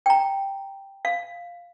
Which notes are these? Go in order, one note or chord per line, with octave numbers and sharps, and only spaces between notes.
G5 A#5
F5